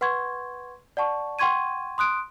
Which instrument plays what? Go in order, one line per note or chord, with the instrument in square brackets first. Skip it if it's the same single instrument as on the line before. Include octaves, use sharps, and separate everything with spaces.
[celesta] B4 F#5 C6 C#6 G#6
D5 F#5 A5 C#6
F#5 G5 C6 C#6 G#6 D#7
C6 D#6 F#6 D7